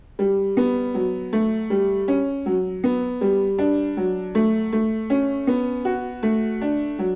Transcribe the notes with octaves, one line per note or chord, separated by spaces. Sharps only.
G3
B3
F#3
A3
G3
C#4
F#3
B3
G3
D4
F#3
A3
A3
C#4
B3
F#4
A3
D4
F#3